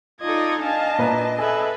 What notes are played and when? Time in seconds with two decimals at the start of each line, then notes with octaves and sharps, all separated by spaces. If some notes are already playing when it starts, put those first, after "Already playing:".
0.21 D#4 F4 A4 D5 D#5 G#6
0.62 D4 D#5 F5 G#5 A5
0.98 A#2 E4 B4 A#5
1.39 G#4 A4 B4 E5 G#5